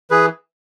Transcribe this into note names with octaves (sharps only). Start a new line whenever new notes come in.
E3 G#4 B4